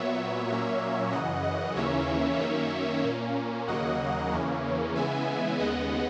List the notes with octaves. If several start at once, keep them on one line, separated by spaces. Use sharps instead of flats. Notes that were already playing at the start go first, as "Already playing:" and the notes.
Already playing: A#2 F#3 B3 C#5 E5
A#2 F#3 A#3 C#4 C#5 E5
F#2 C#3 E3 D#5 F#5
D#5 F#5
D#2 C#3 E3 A#3 C#4 C#5 E5
F#2 D#3 A#3 C#4
A#2 A#3 C#4
D#2 C#3 F#3 A#3 D#5 F#5
E2 C#3 E3 A#3 C#4
C#3 E3 G#3 B3 E5 G#5
D#2 C#3 G#3 B3 D#5 F#5